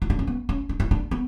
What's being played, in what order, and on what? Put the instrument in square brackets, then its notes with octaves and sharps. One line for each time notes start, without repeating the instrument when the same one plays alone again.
[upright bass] E4
D4
C#4
B3
C#4
D4
E4
D4
B3